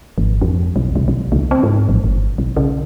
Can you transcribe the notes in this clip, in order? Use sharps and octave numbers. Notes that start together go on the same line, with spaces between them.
G#1
F2
B1
C2
B1
C#2
C4
G#2
A1
G1
B1
C#3